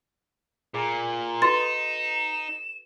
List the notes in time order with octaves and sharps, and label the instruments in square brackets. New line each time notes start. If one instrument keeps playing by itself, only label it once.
[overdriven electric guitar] A#2 [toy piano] G#4 A#5
[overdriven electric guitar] D#4 [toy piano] F#4 A4 B4 [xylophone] C6 A6 [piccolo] E7